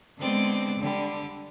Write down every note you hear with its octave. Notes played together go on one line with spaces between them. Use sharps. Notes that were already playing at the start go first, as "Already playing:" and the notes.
D3 G#3 B3 C4 D5
D3 G3